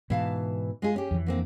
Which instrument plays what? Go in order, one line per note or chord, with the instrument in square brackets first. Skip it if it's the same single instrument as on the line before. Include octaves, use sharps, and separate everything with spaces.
[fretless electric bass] G#2 B2 [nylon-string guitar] E3 F5 A5
[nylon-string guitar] G#3 F4 G#4
C#4 G4
[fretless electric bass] F2 E3
[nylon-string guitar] D3 A#3 C4